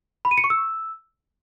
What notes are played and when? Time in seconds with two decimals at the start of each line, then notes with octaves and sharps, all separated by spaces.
0.25 B5
0.31 D#7
0.38 C#7
0.44 C#6
0.50 E6